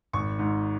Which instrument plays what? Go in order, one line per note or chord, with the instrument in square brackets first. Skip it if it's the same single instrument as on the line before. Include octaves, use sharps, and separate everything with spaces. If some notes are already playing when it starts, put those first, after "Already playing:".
[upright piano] G#1 C#6
G#2